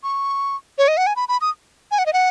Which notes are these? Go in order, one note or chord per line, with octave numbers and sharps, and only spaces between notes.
C#6
C#5
D#5
F#5
G#5
B5
B5
D#6
G#5
F#5
D#5
F#5